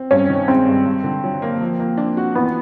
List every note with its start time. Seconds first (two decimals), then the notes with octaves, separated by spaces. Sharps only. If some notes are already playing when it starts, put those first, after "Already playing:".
Already playing: C4
0.11 G2 C#4
0.29 D#3
0.48 G#3 C4
0.67 G2
0.86 G2
1.04 D3
1.24 F#3
1.42 A#3
1.61 F3
1.80 A#3
1.97 D4
2.17 F#4
2.35 E3 B3